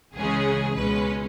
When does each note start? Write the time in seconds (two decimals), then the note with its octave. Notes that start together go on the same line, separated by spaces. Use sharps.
0.14 C#2 C#3 E3 G#3 C#4 G#4
0.75 C#2 B2 G#3 C#4 B4